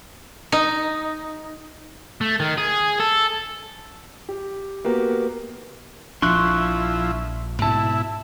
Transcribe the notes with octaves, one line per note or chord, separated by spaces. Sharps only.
D#4
A3
D#3
G#4
A4
G4
A#3 B3 F#4 G4 A#4 B4
A#1 F3 D4 E4 C6 C#6 F#6
G#2 B2 E4 A5